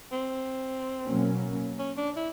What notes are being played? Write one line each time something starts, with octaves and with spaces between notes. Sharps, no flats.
C4
B2 F#3 A#3 C#4
C#4
D4
E4